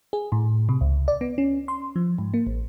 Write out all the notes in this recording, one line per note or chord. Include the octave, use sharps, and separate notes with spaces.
G#4
A2
C3
C#2
D5
B3
C#4
C6
F3
G#2
A#3
A1